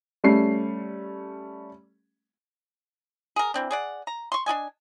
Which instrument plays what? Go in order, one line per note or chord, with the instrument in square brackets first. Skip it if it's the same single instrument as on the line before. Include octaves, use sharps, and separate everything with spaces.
[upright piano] G3 A3 C#4 C7
[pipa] G#4 A#4
E3 C4 D4
G#4 D5 F#5
A#5
C6 C#6
D4 F#4 D#5 G#5